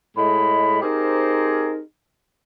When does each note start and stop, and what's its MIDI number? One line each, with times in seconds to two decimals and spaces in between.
0.16 0.78 45
0.16 0.78 56
0.16 0.78 83
0.82 1.79 60
0.82 1.79 63
0.82 1.79 67
0.82 1.79 68
0.82 1.79 70
0.82 1.79 72